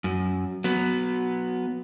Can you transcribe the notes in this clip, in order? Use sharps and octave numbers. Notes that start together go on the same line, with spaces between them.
F#2
F#3 B3